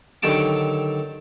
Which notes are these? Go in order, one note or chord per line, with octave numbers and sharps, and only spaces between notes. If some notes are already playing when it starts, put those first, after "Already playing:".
D3 D#3 F#3 G4 A5 D6